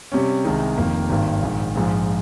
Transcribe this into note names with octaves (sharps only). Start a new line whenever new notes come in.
C3 G3 C#4
C2 C3 D#3 G#3 D#4
F1 F2 D#3 A#3
G#1 G2 D#3 A#3
A#1 G#2 D#3
A#1 G#2 F3